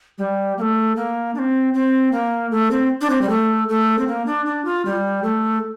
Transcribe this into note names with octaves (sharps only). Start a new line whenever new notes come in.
G3
A#3
A3
A#3
D4
C4
C4
A#3
A3
C4
D4
C4
G3
A3
A3
C4
A#3
D4
D4
F4
G3
A3